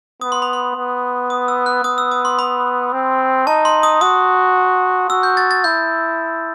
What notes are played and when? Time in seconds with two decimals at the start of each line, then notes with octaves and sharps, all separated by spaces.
0.21 B3 D#6
0.32 C6
0.42 B5
0.53 C6
0.75 B3
1.30 D#6
1.48 E6
1.66 F#6
1.84 B3 D#6
1.98 E6
2.11 D#6
2.25 C6
2.39 B5
2.93 C4
3.46 D#4 A5
3.65 C6
3.83 D#6
4.01 F#4 D#6
5.09 F#4 E6
5.23 G6
5.37 A6
5.51 A6
5.64 E4 G6